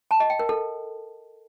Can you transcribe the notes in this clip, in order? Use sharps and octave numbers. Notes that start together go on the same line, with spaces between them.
A5
D#5
G5
A#4
A4